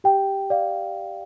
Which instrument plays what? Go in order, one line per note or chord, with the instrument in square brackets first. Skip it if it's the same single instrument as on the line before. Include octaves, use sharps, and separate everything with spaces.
[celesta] G4 G5
D5 F5